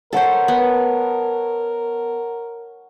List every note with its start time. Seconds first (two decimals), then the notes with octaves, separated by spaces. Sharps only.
0.13 A4 A#4 C5 C#5 F#5 A5
0.48 B3